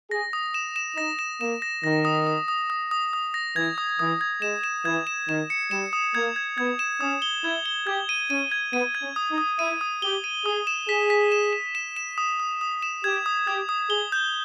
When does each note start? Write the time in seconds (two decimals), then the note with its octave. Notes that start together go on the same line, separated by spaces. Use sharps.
0.11 G#4 A#6
0.33 D#6
0.54 E7
0.76 E7
0.97 D#4 A#6
1.19 E7
1.40 A#3 E7
1.62 A#6
1.84 D#3 A#6
2.05 D#6
2.27 D#6
2.48 D#6
2.70 D#6
2.91 D#6
3.13 D#6
3.34 A#6
3.56 E3 G#6
3.78 D#6
3.99 E3 D#6
4.21 G#6
4.42 G#3 E7
4.64 E7
4.85 E3 G#6
5.07 E7
5.28 D#3 E7
5.50 C#7
5.71 G3 E7
5.93 D#6
6.15 A#3 G#6
6.36 G#6
6.58 B3 G#6
6.79 E7
7.01 C#4 D#6
7.22 G7
7.44 E4 G#6
7.66 G7
7.87 G4 G#6
8.09 D#7
8.30 C#4 D#7
8.52 G#6
8.73 B3 D#7
8.95 G#6
9.02 C#4
9.16 D#6
9.31 D#4
9.38 D#6
9.59 E4 D#7
9.81 D#6
10.02 G4 G7
10.24 D#7
10.46 G#4 D#6
10.67 E7
10.89 G#4 B6
11.10 B6
11.32 E7
11.53 E7
11.75 E7
11.97 E7
12.18 D#6
12.40 D#6
12.61 D#6
12.82 E7
13.04 G4 G#6
13.26 D#6
13.47 G4 G#6
13.69 D#6
13.90 G#4 G7
14.12 G6